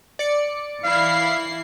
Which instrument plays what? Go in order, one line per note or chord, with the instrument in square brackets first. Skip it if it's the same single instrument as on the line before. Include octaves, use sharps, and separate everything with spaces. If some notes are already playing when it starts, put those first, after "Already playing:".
[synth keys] D5 C#7
[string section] E3 E4 C7 [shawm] F5